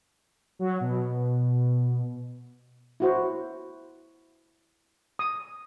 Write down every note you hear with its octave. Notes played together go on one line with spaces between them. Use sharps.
F#3
B2
E4 F#4 C5
D#6